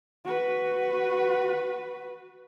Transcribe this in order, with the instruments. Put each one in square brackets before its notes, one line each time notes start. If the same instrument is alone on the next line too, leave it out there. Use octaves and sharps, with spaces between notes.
[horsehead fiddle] F#4 B4